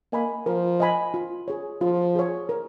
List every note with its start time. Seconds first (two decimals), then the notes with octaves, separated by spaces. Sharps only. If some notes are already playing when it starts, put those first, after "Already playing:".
0.13 A#3 D#5 G#5 B5
0.46 F3 A#4
0.80 D#5 G#5 B5
1.14 F4
1.48 G#4 C#5
1.81 F3 F4
2.16 G#4 C#5
2.49 A#4